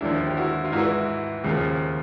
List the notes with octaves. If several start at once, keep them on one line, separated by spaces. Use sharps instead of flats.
D#2 D3 F3 D4 E4
G4
E4 F#4
F4
G#2 E3 E4 F#4
D#2 C#3 F3